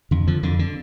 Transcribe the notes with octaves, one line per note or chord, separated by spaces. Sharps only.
F2 D3
D3 F3
F2 D3
D3